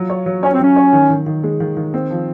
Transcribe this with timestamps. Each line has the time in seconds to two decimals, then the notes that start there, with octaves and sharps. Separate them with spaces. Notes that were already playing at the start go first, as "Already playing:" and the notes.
Already playing: F#3 F4
0.10 C#5
0.26 F#3
0.43 C#4 C#5
0.53 C4
0.60 F#3 C#4
0.76 C#5
0.93 D#3
1.10 D#3
1.26 D#3
1.43 G#3
1.60 D#3
1.77 D#3
1.94 C4
2.11 F3